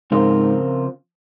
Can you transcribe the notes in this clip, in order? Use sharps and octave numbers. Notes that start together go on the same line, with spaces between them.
G#2 C#3 F3 C4 F4 A#4